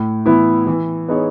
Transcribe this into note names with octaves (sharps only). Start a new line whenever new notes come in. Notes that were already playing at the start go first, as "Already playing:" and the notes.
Already playing: A2
E3 B3 E4
E3
B3 D#4 G#4 C#5